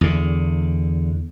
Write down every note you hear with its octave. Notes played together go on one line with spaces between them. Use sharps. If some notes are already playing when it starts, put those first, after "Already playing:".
E2 D3